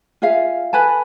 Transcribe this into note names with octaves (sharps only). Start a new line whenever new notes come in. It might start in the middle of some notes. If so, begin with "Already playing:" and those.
F4 G#4 E5 F5
A4 B4 G#5 A5